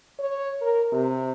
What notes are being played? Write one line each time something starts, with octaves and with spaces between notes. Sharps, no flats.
C#5
A#4
C3